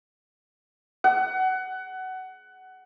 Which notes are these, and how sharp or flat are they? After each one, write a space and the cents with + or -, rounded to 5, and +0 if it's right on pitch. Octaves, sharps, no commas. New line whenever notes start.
F#5 +20